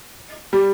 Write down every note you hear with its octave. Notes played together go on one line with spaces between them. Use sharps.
G3